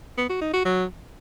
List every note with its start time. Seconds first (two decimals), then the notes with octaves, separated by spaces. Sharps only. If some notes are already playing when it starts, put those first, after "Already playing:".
0.18 B3
0.30 F#4
0.41 D#4
0.53 F#4
0.65 F#3